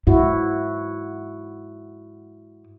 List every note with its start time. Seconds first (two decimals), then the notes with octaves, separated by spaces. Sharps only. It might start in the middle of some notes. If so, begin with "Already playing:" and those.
0.07 G#2 E4 F#4